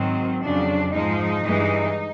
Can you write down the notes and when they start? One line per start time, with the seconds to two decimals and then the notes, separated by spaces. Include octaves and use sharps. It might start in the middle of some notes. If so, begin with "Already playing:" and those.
Already playing: G#2 D#3 F#3 C4
0.42 F2 C#3 F#3 D4
0.93 G#2 F3 G#3 D#4
1.44 G2 E3 G#3